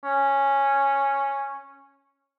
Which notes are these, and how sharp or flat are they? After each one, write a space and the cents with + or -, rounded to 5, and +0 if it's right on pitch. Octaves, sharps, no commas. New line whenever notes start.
C#4 -5